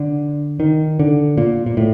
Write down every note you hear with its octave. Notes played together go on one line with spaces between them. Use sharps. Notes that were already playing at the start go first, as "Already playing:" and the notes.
Already playing: D3
D#3
D3
A#2
A#2
A2